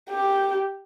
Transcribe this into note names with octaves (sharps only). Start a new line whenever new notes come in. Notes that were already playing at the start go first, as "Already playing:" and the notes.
G4